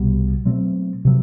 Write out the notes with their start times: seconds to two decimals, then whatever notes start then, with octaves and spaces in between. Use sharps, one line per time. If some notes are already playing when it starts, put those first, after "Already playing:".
Already playing: C2 B2 G3
0.45 B2 F#3 A3 C4
1.05 C3 F#3